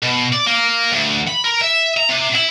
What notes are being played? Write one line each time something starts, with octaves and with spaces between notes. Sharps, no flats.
B2
D5
A#3
D2
B5
A#4
E5
A#5
C3
E4